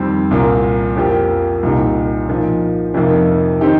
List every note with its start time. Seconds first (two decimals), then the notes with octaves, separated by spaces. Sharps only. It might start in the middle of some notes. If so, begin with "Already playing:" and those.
Already playing: F2 D#3 G3 C4
0.31 C2 A#2 A#3
0.96 F2 F3 A#3 G4
1.63 C2 A#2 A#3 D#4 G4
2.29 A#2 F3 D#4
2.94 F2 C3 F3 A#3 D#4
3.61 D#3 C4 D#4 G4